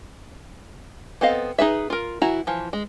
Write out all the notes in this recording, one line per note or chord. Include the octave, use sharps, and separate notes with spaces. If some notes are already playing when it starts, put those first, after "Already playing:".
B3 C4 A4 D#5 F5
D#4 G#4 B4 E5
F4 A#4
E3 E4 F#4 A#5
E3 F3
G#3